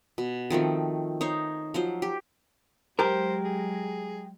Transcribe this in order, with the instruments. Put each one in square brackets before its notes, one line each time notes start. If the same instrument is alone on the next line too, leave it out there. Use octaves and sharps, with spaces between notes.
[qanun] B2
D#3 F3 A3 C4
D#4 C5 C#5
F3 F#3 C5
G4
[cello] F#3 G#3 [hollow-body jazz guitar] G4 A#4 [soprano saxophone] C5
[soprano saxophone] G#4